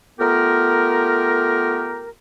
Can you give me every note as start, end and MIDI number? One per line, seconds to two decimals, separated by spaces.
0.19 2.10 57
0.19 2.10 59
0.19 2.10 65
0.19 2.10 67
0.19 2.10 70